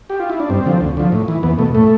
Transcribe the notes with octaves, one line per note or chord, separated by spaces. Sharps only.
G4
F4
E4
D4
G2 C4
D3 F3
D2
D3 F3
A2
E3
E2 B3
B2 A3
A2 A3